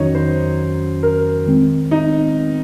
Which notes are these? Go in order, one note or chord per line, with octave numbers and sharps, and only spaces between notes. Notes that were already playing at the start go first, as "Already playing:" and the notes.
Already playing: F2 D#3 F#3 C#4 D#4 F#4 C#5
C5
A#4
D#3 G#3 C4
D#4